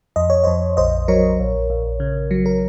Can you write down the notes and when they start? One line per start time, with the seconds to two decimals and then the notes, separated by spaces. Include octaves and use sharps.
0.16 F2 D#5
0.30 C#5
0.44 F2 C5 D#5
0.77 A#1 C5 D#5
1.08 F#3 A#4 C#5
1.39 A#1
1.70 A#1
2.00 C#3
2.31 F#3
2.46 A#4